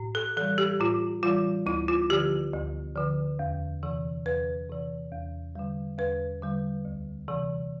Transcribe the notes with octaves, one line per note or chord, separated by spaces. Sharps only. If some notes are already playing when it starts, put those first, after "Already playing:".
Already playing: A2
A4
E3 G3 A4
G4
A2 F4
E3 G3 F4
D2 E4
F4
D3 F3 G4
D2
D3 F3
E2
C3 E3
E2 B4
C3 E3
E2
D3 G3
E2 B4
D3 G3
D2
C3 E3